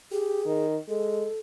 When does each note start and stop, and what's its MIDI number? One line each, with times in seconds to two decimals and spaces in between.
0.12 0.40 67
0.12 0.65 68
0.45 0.77 51
0.89 1.25 56
0.89 1.40 69